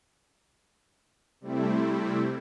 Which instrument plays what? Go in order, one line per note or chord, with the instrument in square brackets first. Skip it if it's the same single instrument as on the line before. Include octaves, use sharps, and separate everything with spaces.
[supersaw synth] C3 G3 A3 C4 E4